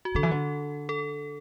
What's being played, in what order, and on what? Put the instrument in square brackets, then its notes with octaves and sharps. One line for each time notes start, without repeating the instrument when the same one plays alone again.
[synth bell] F#4
[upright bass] D3 [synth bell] A4
[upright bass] E3
D3
[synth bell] A4